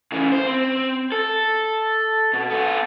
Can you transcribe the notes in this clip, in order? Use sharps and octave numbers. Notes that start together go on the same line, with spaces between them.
C#3 E3
C5
C4
A4
B2
B3 A4